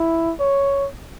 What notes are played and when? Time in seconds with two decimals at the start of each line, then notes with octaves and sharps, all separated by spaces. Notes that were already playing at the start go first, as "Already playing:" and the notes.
Already playing: E4
0.40 C#5